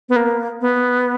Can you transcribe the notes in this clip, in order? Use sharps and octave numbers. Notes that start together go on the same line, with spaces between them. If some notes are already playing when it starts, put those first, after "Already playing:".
B3
A#3
B3